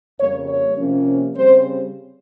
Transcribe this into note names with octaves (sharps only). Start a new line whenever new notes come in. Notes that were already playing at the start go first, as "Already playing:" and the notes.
F2 C#3 G3 A#3 C#5
C#5
C3 F3 A#3 C#4
C#3 G3 C4 C5